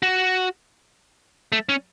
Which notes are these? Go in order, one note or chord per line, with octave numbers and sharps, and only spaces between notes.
F#4
A3
C#4